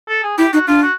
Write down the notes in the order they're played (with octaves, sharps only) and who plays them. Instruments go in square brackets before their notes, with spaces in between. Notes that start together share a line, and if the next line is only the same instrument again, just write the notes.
[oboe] A4
G#4
[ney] E4 [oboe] G4
[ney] D#4 [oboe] F#4
[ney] D4 [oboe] F4
[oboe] F#4